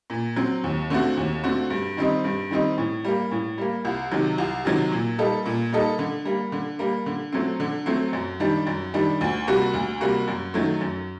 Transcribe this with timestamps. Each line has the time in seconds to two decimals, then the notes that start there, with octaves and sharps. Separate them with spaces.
0.10 A#2
0.36 F#3 C4
0.64 D#2
0.90 D3 A3 C4 F#4
1.17 D#2
1.44 D3 A3 C4 F#4
1.70 G2
1.97 D#3 G3 C4 D#4
2.24 G2
2.51 D#3 G3 C4 D#4
2.78 A2
3.04 G3 A#3
3.31 A2
3.58 G3 A#3
3.85 C2
4.12 C3 D#3 F#3
4.38 C2
4.65 C3 D#3 F#3
4.92 A#2
5.19 G3 A#3 D#4 A4
5.46 A#2
5.72 G3 A#3 D#4 A4
5.99 D3
6.25 G3 A#3
6.52 D3
6.79 G3 A#3
7.06 D3
7.33 F#3 A3 C4
7.60 D3
7.86 F#3 A3 C4
8.13 F#2
8.40 D#3 G3 D4
8.67 F#2
8.94 D#3 G3 D4
9.21 D2
9.47 C3 G3 A#3 F#4
9.74 D2
10.01 C3 G3 A#3 F#4
10.28 F#2
10.54 D#3 F#3 A3
10.81 F#2